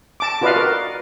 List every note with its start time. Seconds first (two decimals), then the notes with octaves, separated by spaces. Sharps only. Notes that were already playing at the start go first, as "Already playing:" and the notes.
0.20 A5 D6
0.41 F4 F#4 B4 D5 D#5 F5
0.56 A#4